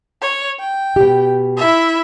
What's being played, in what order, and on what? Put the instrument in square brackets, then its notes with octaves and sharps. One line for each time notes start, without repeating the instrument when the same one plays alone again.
[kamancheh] C#5
G5
[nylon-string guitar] B2 G4
[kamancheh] E4 E5